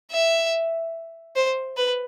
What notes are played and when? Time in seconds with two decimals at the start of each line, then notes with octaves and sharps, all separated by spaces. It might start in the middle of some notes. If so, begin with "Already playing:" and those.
0.12 E5
1.36 C5
1.77 B4